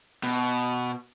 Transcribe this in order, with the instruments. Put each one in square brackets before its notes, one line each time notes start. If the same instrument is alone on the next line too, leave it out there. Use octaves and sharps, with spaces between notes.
[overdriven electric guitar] B2